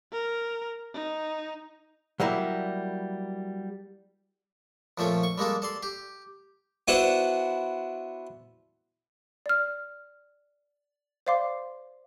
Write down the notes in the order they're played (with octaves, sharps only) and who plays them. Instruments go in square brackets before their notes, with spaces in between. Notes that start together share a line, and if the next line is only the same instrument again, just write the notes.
[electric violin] A#4
D#4
[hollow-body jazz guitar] F#3 G3 A#3 E4
[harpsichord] F2 A#2 F3 A3 C#4
C#6
G3 G#3 A#3 D4 A4
A4 D5 C6
G4
B3 D4 E4 F#4 B4 C5
[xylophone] D5 F6
C5 D5 F5 C6 D6